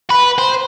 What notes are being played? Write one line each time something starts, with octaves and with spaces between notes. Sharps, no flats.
B4
C5